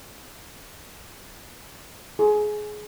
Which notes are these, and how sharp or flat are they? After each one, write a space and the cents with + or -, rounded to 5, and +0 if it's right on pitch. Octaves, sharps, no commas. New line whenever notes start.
G#4 +20